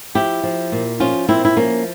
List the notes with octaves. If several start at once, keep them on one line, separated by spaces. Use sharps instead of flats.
F3 E4 G4
F3
A#2
F3 C#4 F4
A#2 C4 E4
E4
F3 A#3 C#4